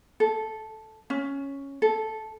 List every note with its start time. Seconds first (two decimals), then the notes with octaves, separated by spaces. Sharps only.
0.20 A4
1.10 C#4
1.82 A4